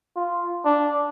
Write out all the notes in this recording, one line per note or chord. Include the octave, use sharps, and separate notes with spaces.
F4
D4